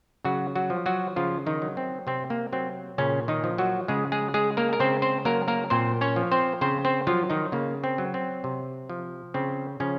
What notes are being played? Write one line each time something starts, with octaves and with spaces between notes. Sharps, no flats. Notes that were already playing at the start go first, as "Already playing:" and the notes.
C#3 F#3 F#4
F#3 F#4
F3
F#3 F#4
C#3 F3 F4
D#3 D#4
F#3
C4
C3 C4
A#3
F#3 C4
A#2 C#3 C#4
D#3 D#4
F3
F#3 F#4
C#3 G#3 G#4
G#3 G#4
G#3 G#4
A#3 A#4
A#4
C#3 C4 C5
C4 C5
F#3 A#3 A#4
A#3 A#4
A#2 C4 C5
C#4 C#5
F3
C4 C5
C#3 C4 C5
C4 C5
F3 F#3 F4
D#3 D#4
C#3 A#3
C4
F#3
C4
C3
F3
C#3 C4
C#3 F3 C#4